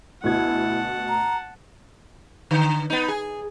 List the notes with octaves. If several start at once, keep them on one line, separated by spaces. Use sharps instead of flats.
D2 B2 E4 F#5 A5 G#6
A#5
D3
B3 D#4
G#4